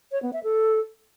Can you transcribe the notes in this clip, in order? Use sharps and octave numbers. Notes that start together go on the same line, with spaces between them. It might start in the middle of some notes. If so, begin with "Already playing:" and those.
C#5
B3
E5
A4